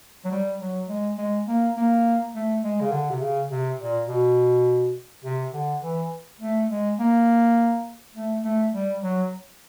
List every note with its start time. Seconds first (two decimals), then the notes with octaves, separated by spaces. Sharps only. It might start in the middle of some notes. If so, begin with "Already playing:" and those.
0.25 F#3
0.31 G3
0.61 F#3
0.89 G#3
1.18 G#3
1.47 A#3
1.76 A#3
2.35 A3
2.64 G#3
2.81 C#3
2.92 D3
3.10 C3
3.22 C#3
3.51 C3
3.79 A#2
4.08 B2
5.24 C3
5.54 D3
5.82 E3
6.41 A3
6.70 G#3
6.99 A#3
8.15 A3
8.44 A3
8.73 G3
9.02 F#3